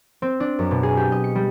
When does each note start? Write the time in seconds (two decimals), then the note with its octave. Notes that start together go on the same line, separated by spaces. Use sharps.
0.22 C4
0.40 D4
0.59 F#2
0.71 B2
0.83 G#4
0.97 G4
1.12 D#5
1.24 C#7
1.35 G3